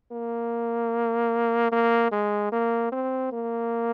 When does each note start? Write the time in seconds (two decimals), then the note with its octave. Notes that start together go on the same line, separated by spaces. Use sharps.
0.12 A#3
1.72 A#3
2.12 G#3
2.52 A#3
2.92 C4
3.32 A#3